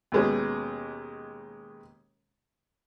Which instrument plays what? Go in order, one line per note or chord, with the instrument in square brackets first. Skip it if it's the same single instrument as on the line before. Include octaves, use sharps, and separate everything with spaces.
[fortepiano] D#2 B2 G#3 C#4